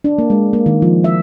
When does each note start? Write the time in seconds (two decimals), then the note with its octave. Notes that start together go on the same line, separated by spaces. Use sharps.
0.04 D4
0.18 A#3
0.30 G#3
0.53 A#3
0.66 D#3
0.82 F3
1.04 E5